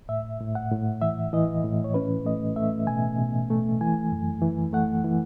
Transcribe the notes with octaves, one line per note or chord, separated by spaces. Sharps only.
A2 E5
A2
F#5
A2
E3 E5
E3 D#5
A2
C#5
C#4 B4
A3 D#5
A3 E5
B2 G#5
B2
A3
E3 G#5
F#2
E3
A3 F#5
E3